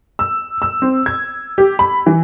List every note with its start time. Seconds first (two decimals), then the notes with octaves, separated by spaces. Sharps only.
0.19 E6
0.62 E6
0.82 C4
1.06 G#6
1.58 G4
1.79 B5
2.06 E3